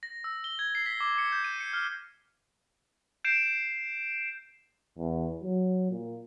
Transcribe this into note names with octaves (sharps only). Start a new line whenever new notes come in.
A#6
E6
G7
G#6
C7
B6
D6
C#7
G6
D#7
C#7
F6
G6 C7 D7 E7
E2
F#3
A#2